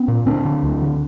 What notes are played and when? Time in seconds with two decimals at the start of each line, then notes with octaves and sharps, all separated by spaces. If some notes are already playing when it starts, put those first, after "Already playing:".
Already playing: B3 C#4
0.08 A#2
0.26 D2 C4 D4
0.45 D3
0.63 D2
0.82 D3